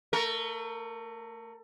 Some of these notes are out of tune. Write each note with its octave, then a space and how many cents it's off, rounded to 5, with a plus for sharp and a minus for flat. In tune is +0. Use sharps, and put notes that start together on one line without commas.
A3 +25 A#4 +0